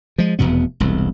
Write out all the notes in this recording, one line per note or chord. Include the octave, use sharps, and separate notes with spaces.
F3 G#3
F1 E2 B2 B3
E1 C2